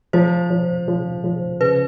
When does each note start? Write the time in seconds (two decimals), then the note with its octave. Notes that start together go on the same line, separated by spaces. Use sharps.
0.13 F3 C5
0.50 F3
0.88 F3
1.24 F3
1.60 C#3 B4